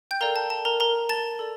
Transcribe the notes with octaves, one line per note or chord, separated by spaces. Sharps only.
G5 G6
A4 A#4 D5 F5 A#5
A5
A5
A#4 A#5
A#4 A#5
A5 A6
A4 D5